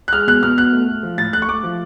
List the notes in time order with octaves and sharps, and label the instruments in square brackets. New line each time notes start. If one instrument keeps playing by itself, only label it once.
[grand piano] F#6
G#3 F6
B2 F#6
B2 F6
B2 F#6
A3
A3
F3
A2 A6
A3 F#6
C#6
A3 D6
F3